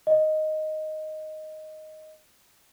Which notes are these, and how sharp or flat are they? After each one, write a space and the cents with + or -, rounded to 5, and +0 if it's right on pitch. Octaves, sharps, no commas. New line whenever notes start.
D#5 +0